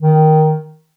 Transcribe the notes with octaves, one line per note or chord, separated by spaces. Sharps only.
D#3